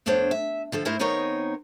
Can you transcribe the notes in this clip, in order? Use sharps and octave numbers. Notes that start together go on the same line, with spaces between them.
F2 A3 B3 D4 C5 C#5
E5
D3 F3 A4
G#2 A3 E4 A#4 C5 D#5
D#3 B3 C4 D#4 A#4 C#5